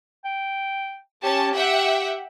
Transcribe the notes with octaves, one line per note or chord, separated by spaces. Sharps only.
G5
C#4 G4 A5
E5 F#5 G5